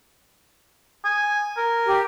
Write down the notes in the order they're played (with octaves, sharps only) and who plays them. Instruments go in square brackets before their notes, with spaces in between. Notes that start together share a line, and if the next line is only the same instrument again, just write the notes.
[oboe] G#5
A#4
[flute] G4